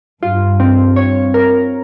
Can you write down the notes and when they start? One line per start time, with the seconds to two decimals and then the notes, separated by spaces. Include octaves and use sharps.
0.22 G2 F4
0.60 C4
0.96 C#5
1.34 A#4